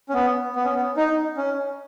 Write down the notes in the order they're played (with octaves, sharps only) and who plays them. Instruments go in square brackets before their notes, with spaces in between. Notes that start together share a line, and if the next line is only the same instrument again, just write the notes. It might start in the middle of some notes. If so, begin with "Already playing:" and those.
[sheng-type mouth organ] C#4
B3
B3
C#4
B3
D#4
C#4